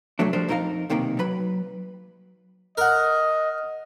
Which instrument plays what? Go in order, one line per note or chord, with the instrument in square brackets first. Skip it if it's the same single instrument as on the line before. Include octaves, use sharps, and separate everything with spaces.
[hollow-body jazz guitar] C2 F#2 F#3 A3 D4
F3 G3 D4 A#4 C5
F2 D#4 A#4 C5 F5 A#5
B1 C3 D#3 A#3
F#3 B4 B5
[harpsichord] A#4 F#5 [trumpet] D#5